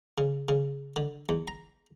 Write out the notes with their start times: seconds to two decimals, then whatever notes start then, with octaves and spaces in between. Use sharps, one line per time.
0.18 C#3
0.49 C#3
0.96 D3
1.29 E2
1.48 A#5